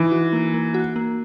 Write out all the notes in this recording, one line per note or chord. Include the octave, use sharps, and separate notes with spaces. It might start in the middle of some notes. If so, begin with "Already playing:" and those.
Already playing: E3 D#4
F#4
A#3
A#3
F#4
A#3